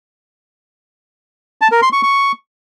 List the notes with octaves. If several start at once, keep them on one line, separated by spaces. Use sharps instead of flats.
A5
A#4
C6
C#6
C#6